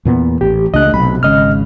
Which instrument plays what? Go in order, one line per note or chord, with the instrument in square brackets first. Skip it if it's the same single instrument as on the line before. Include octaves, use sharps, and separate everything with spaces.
[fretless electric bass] E2 A#2 B3
[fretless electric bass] A1 [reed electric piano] G4
[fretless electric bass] C#2 A3 D4 [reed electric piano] D#5 F#6
[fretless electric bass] B1 C3 [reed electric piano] B5
[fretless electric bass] G#1 C#3 G#3 [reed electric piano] D#5 F6